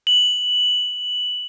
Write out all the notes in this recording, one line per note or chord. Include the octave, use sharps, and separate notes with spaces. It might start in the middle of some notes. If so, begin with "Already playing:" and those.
F#7